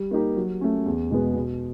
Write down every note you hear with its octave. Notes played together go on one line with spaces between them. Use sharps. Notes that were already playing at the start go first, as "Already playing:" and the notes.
Already playing: G3
A#3 D#4 G4 A#4
F#3
A3 C#4
E2
B2 G#3 B3
B2